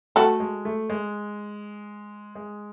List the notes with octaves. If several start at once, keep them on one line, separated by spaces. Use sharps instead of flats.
A3 F#4 A4
G#3
A3
G#3
G#3